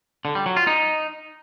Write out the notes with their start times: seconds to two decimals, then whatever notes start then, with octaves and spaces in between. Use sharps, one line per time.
0.25 D3
0.35 G3
0.46 F#3
0.57 F4
0.67 D#4